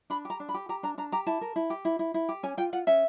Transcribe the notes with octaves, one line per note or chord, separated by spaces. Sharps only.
D4 B5
G4 A#5
D4
B5
G4
G4 A#5
D4 A#5
D4 A#5
G4 A#5
E4 A5
A#4
E4
G4
E4
E4
E4
G4
C#4 G#5
F4 G5
F4 F#5
C#4 E5